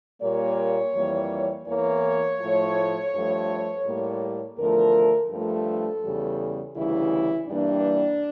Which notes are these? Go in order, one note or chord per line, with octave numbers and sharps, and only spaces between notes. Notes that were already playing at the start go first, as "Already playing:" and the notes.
A#2 G3 A#3 C#5
F2 E3 G3 A#3
E2 E3 A#3 C#5
A2 F3 A3
G2 F3 A3
A2 G3 A#3
E2 D3 F3 A3 A#4
G2 F3 A3 A4
E2 C#3 G3
D2 C#3 E3 G3 E4
G2 E3 G3 A#3 D4